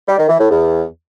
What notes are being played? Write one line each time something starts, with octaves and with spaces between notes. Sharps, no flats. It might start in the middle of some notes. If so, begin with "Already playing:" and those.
G3
D#3
E3
A2
E2